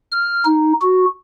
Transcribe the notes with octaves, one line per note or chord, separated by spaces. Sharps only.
F6
D#4
F#4